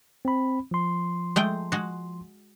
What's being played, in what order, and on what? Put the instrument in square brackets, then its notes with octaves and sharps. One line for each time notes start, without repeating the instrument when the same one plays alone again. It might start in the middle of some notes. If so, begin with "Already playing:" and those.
[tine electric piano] C4 B5
F3 C6
[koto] G#3 A3 G5
G#3 F#4